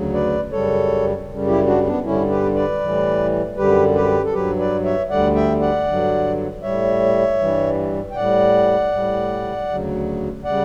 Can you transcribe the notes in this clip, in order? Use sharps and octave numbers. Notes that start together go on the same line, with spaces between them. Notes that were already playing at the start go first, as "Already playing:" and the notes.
Already playing: D2 C#3 F#3
B4 D5
F#2 C#3 G3 A4 C#5
F#2 C#3 G3
E4 G4
D4 F#4
B3 D4
G2 D3 G3 C#4 E4
G4 B4
B4 D5
A2 E3 G3
F#2 D3 G3 G4 B4
G4 B4
A4
G2 F#3 G4 B4
B4 D5
C#5 E5
D2 D3 G3 D5 F#5
E5 G5
D5 F#5
G2 D3 F#3
A2 G3 C#5 E5
G2 E3 G3
G5
A2 G3 D5 F#5
A2 G3
D2 C#3 F#3
C#3 G3 D5 F#5